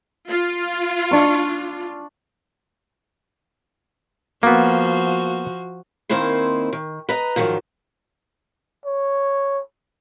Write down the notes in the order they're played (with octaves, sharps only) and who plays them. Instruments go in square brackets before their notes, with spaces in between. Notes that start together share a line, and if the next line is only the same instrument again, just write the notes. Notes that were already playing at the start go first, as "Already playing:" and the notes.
[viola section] F4
[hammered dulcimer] D4 C#6
[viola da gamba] F3 F#4 [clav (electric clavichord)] A#3 B3
[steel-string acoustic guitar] D#3 A#3 C4 D#4 E4 C5
D#3
B4 D#5 A#5
G#2 D#3 F3 F#3
[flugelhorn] C#5